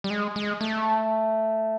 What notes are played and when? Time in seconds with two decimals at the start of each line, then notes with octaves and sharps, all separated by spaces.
0.04 G3
0.10 G#3
0.36 G#3
0.61 A3